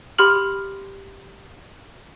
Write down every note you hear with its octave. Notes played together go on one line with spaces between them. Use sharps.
G4 B5 C6 F6 F#7